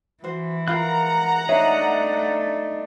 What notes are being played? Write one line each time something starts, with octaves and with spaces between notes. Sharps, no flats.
E3 F#4 C5
F4 A#4 F5 F#5 A#5 B5 F#6
A3 D4 D#4 C#5 E5 F5